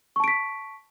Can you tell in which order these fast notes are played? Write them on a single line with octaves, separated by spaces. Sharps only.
C#6 A5 D7 B6